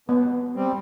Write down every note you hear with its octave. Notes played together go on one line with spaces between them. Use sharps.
B2 B3
G3 C4